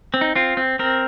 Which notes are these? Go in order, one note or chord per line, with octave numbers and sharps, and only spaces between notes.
C4
D#4
C4 F4
C4
C4 A#4